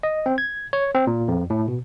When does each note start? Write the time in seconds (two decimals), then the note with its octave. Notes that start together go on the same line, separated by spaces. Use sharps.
0.03 D#5
0.26 C4
0.38 G#6
0.73 C#5
0.94 C4
1.07 A#2
1.28 F2
1.50 A2
1.68 B2